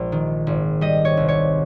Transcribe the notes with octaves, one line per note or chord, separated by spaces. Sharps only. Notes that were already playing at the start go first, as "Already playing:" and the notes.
Already playing: A#1 G#3
D#3
G#1
G3 D#5
C#5
C2
C#5